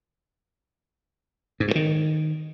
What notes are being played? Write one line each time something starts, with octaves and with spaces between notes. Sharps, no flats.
G#2
G2
D#3